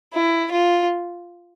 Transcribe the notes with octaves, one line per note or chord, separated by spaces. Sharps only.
E4
F4